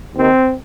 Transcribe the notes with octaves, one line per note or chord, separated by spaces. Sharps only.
D#2 D#3 C4